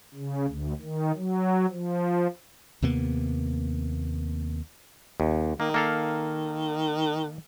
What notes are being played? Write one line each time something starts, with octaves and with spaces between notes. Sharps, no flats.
C#3
D2
D#3
F#3
F3
D#2 C3 A#3 B3
D#2
D#3 A#3
A#3 A4 F5